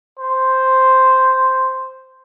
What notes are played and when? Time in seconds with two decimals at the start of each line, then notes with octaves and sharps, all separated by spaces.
0.19 C5